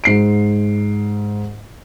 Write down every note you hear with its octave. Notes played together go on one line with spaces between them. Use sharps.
G#2 C7 D7